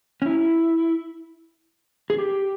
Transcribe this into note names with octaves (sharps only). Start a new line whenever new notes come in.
C#4
E4
G#4
G4